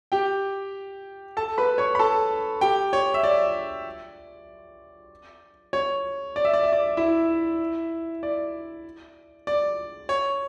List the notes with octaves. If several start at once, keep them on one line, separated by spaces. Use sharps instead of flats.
G4 G5
A4 A5
B4 B5
C#5 C#6
B5
A4 A5
G4 G5
C#5
E5
D5
C#5
D5
E5
D5
E5
D5
E4 E5
D5
D5
C#5